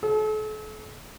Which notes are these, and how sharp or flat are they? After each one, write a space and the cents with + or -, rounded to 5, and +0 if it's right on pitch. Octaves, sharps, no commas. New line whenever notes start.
A4 -40